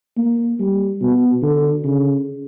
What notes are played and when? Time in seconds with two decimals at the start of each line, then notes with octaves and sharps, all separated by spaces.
0.17 A#3
0.59 G3
1.01 B2
1.43 D3
1.85 C#3